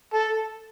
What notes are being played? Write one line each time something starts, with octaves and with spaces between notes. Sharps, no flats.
A4